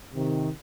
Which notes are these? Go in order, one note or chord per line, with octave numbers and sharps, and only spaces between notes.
C3 D#3